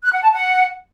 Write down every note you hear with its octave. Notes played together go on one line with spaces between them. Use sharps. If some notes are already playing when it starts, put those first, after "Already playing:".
F#6
F#5
A5
F#5